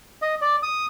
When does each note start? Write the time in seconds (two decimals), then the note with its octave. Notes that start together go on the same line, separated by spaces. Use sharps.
0.22 D#5
0.41 D5
0.63 D#6